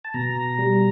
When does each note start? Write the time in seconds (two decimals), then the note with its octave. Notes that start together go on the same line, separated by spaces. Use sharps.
0.04 A5
0.14 B2 A#5
0.59 G3